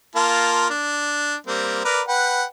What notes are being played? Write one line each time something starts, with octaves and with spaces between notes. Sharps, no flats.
A#3 F4 A5
D4
G3 A#3 C4
A#4 B4 D5
B4 F#5 G5